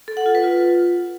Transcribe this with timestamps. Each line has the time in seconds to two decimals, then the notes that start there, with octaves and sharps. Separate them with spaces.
0.08 A4
0.17 F#5
0.26 F4
0.35 B4
0.44 F4